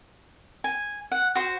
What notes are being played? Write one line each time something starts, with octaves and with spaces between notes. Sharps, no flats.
G#5
F#5
F#4 C5